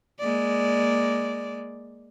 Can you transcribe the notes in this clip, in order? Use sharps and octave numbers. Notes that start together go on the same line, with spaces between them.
G#3 A#3 D5